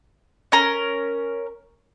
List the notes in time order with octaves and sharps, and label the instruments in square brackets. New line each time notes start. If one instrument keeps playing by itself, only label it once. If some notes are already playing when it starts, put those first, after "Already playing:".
[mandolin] C#4 A#4